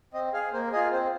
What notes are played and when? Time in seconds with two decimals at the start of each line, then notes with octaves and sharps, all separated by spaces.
0.14 C4 D#5
0.33 G#4 F5
0.53 A#3 C5
0.72 F4 G#4 D#5
0.92 C4 C5